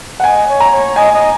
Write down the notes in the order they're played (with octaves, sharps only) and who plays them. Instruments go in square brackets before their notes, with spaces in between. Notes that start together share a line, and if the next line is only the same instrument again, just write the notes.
[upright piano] F#5
[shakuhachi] D#5 [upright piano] G#5
[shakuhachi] C#5
[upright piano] A#5
[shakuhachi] C#5
[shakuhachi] D#5 [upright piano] G#5
[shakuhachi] D#5